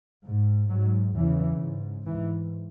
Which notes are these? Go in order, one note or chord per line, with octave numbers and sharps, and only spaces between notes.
G#2
G#2 F#3
E2 C#3 E3
G#2
G#2 E3